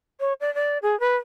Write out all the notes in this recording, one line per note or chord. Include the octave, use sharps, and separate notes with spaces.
C#5
D5
D5
G#4
B4